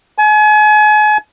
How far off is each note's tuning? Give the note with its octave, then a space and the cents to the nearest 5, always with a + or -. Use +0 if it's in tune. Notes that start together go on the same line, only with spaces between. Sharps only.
G#5 +35